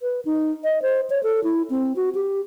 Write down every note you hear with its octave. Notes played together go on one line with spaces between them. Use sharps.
B4
D#4
D#5
C5
C#5
A4
E4
C4
F#4
G4